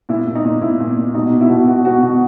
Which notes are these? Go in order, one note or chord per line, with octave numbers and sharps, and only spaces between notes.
A#2 E4
A#2
D#4
A#2
A#2 E4
A#2
A#2
B2 D#4
B2
E4
B2 F#4
E4
B2 F#4
B2 F#4
B2 F#4